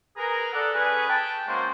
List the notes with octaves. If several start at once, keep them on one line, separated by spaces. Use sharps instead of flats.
G#4 A#4 B4 G#5 A#5
A4 D5 F#5
C#4 G#4 B4
G5 A5
G#3 A#3 C#4 F#4 C5